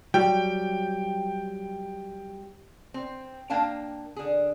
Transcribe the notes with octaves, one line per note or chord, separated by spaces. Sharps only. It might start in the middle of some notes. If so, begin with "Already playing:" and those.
F#3 G3 G5
C4
A#3 D4 F5 G5 A5
D3 G#4